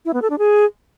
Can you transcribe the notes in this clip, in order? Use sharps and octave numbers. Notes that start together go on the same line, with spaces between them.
E4
B3
A4
D4
G#4